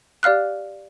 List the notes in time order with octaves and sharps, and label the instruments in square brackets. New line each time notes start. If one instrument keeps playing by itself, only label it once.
[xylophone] G4 D5 F5 F6 F#6